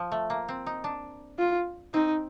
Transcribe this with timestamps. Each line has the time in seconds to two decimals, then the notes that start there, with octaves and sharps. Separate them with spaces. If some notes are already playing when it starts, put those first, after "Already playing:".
Already playing: F3
0.12 A3
0.30 A#3
0.48 C4
0.66 D#4
0.84 D4
1.38 F4
1.93 C4 D#4